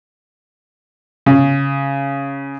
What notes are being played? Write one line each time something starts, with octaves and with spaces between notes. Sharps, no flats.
C#3